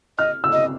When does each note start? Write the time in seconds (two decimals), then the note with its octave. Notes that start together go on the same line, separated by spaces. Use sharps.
0.18 D#5 F6
0.44 E6
0.53 D#5